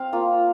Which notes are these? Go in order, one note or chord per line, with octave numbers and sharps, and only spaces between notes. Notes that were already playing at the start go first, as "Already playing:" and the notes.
Already playing: C4 F5
A#3 F4